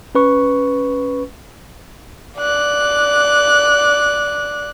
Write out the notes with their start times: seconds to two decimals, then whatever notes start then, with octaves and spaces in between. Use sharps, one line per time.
0.15 C#4 B4 C#6
2.38 D5 F#6